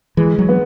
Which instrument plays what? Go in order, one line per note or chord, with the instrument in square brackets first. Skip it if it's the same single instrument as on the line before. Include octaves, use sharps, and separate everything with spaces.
[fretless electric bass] E3 [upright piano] G#3
[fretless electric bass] F#3
[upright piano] B3